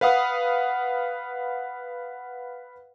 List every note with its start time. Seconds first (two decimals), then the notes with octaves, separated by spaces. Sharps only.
0.01 B4 F5 F#5 D#6